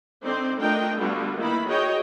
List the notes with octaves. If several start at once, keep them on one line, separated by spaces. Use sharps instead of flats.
D3 C4 D#4 C5 D5
A3 D4 F4 A#4 D#5 G5
D3 G3 A3 B3 F4 F#4
D#3 A#3 D#4 E4 B4 B5
F#4 G#4 C#5 D#5 G5